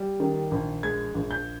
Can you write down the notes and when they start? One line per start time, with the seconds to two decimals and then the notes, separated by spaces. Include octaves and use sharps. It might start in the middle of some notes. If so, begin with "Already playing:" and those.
Already playing: G3
0.20 D#3
0.51 A#1
0.83 G#3 G#6
1.15 A#1
1.31 G6